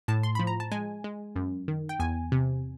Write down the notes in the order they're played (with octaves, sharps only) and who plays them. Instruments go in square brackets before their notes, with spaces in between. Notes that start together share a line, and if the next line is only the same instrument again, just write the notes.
[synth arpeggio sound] A2 A5
C6
F3 B5
A#5
A5
G#3 G#5
G#3
F#2
D#3
G5
E2 G#5
C3